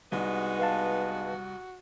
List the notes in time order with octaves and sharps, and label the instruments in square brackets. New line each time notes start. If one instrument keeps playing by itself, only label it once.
[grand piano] C2 [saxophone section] G#3 B3 D#4 [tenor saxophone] F#4
[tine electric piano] B4 F5 A5